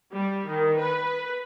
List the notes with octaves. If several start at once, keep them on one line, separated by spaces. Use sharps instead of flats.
G3
D#3
B4